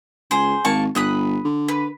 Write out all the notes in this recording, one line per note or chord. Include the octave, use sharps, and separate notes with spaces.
C#2 G#4 C5
G#1 A#3 A5 C#6
G1 B5 D#6 F#6
D3
B4